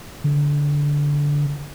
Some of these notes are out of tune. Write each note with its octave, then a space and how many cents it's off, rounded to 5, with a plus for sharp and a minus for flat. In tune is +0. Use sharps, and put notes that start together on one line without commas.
D3 -15